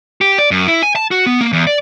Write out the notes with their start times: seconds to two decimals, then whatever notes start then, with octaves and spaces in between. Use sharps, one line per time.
0.21 G4
0.38 D5
0.51 F#2
0.68 E4
0.83 G#5
0.96 A5
1.11 F#4
1.26 B3
1.41 A#3
1.53 E2
1.67 D5